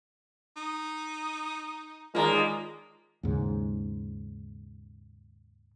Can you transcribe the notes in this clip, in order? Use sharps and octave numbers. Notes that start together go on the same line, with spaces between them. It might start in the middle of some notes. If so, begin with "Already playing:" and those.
D#4
D#2 G#2 G#3 A#3 F4 D5 A#5
D#2 G#2 C#3